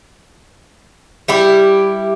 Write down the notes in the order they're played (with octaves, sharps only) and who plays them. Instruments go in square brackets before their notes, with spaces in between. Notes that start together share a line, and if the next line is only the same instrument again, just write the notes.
[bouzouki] G3 E4 G4